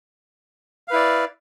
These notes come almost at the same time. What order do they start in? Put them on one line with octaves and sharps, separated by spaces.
F5 B4 E4 D5